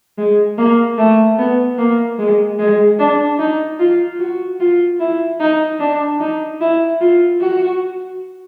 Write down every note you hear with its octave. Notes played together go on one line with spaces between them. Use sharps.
G#3
A#3
A3
B3
A#3
G#3
G#3
D4
D#4
F4
F#4
F4
E4
D#4
D4
D#4
E4
F4
F#4